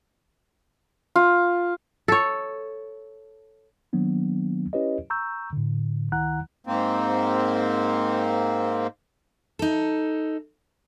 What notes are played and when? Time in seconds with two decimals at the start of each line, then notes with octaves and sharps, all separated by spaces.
1.16 F4
2.08 A4 C#5
3.93 D#3 F#3 A#3 B3 D4
4.73 C#4 E4 G4 B4 C#5 D#5
5.10 A#5 C#6 E6 G6
5.53 A2 D3
6.12 C#2 D#3 E4 F#5 A#5 F#6
6.67 G#2 A#3 C4
9.59 D#4 A4